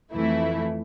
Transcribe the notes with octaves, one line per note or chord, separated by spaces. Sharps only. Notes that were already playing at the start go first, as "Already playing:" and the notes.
F2 E3 A3 E4